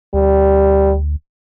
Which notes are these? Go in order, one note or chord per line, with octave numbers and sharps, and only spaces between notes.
D2 G3